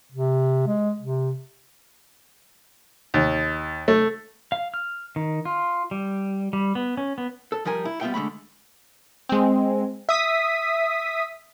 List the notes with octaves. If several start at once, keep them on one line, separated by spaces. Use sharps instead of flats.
C3
G#3
C3
D#2
A3
F5
F6
D#3
F4
G3
G3
B3
C#4
B3
A4
F3 G3 A#4 G#5
E4
G3 B3 F4 E5 G5
D3 G#3 A3 B5
G#3 C4
E5 D#6 B6